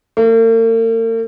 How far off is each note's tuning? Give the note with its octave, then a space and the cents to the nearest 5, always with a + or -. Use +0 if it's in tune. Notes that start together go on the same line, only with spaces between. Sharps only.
A#3 -45